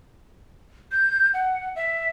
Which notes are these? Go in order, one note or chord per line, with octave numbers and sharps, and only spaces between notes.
G6
F#5
E5